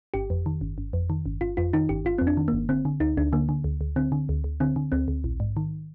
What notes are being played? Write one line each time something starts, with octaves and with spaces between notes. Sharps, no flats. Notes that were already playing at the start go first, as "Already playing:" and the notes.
G1 G4
F2
D#3
G1
G1
F2
D#3
G1
G1 F4
F2 F4
D#3 D#4
G1 G4
G1 F4
C4
F2
D4
D#3
G1 A#3
D3 C4
D3
D2 D#4
D2 D4
D3 A#3
D3
D2
D2
D3 C4
D3
D2
D2
D3 C4
D3
D2 C4
D2
A#1
G#2
D#3